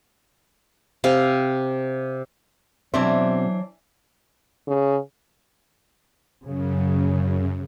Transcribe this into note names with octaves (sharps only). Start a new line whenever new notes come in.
C3 F5
B2 E3 F#3 C4 D4 C5 E5
C#3
F#2 C#3